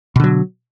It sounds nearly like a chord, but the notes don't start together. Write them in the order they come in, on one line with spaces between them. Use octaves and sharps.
B2 D3 F#3